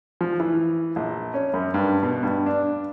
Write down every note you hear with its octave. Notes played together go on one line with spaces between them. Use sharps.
F3
E3
A#1
C#4
F#2
G2
B2
G2
D4